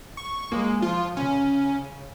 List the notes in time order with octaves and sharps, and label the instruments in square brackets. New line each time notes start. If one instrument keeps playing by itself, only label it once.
[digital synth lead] C#6
[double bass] G#3 [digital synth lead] A#3
[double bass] F3 [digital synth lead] F4
[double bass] C#3 [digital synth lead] C#4